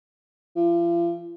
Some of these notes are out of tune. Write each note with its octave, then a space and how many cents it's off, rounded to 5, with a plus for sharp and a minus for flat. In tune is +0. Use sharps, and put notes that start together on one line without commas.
F3 -40